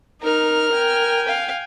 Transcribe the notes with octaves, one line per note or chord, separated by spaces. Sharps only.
D#4 A#4 F6
G5 G#5
F5